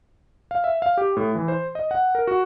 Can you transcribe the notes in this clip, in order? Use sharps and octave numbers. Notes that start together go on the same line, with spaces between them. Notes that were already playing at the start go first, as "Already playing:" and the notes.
F5
E5
F5
G4
A2
E3
C5
D#5
F#5
A#4
F#4